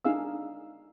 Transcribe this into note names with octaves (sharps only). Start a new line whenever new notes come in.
D4 D#4 G#4 F5 G#5 E6